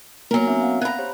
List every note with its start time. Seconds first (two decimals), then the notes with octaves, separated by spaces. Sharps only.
0.31 F#3 A#3 B3 A#4 G#5
0.47 C4 D4 E5
0.62 F5 F#5
0.82 G#5 A#5 B5 F#6
0.99 G4 C5 C#5